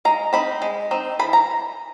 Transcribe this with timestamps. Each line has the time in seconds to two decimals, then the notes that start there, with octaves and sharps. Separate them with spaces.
0.05 G#3 A#5
0.33 C4 D#4 B5
0.62 G#3
0.91 C4 D#4
1.19 E3 B5
1.33 A#5